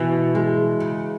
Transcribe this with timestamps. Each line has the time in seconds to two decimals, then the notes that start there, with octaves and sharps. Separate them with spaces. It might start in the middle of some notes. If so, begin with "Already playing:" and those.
Already playing: B2 E3
0.35 G#3
0.80 C#3